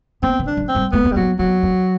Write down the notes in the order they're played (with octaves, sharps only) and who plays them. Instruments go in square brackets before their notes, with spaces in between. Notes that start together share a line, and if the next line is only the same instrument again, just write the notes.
[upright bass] B3 [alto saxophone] C4
[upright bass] E3
[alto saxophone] D4
[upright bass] F#3
[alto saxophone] C4
[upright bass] G3
[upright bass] A3 [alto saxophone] B3
[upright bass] C4
[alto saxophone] G3
[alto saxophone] F#3 [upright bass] B3
[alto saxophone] F#3 [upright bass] B3
[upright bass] C4